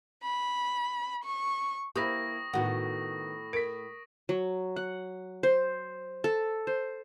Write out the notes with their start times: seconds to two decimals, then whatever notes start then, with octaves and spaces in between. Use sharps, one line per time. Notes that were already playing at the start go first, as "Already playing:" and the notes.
0.23 B5
1.24 C#6
1.96 A#3 E4 G4 B4 C#6 D#6 A#6
2.53 A2 D#3 B3 F#4 F#5
3.53 A#4 B6 D7
4.29 F#3
4.76 F#5
5.43 C5
6.24 A4
6.67 C5